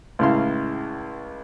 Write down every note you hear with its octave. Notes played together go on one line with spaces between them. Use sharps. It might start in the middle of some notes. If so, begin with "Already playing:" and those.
C#2 A2 C#3 E4 F5 C6